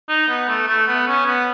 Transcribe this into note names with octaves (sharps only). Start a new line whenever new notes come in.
D#4
B3
A3
A3
B3
C#4
B3